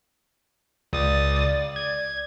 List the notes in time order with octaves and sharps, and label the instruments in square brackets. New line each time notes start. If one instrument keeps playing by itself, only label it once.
[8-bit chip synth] C#2 D#6 A6 [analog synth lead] D5
[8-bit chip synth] G#6